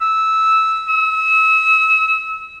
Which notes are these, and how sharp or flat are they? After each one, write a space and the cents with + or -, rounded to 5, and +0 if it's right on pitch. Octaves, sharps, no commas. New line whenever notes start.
E6 -10
E6 -35